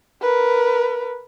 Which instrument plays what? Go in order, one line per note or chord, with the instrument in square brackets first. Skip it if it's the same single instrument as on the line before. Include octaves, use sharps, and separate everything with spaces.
[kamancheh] A#4 B4